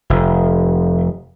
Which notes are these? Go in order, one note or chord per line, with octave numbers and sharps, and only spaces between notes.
F1